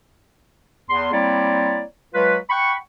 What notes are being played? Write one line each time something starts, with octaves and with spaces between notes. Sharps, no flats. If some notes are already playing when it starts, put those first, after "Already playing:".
E2 C6
G3 A#3 C4 E4 C#5 D5
F#3 G#3 F4 B4
F#5 G5 B5 C#6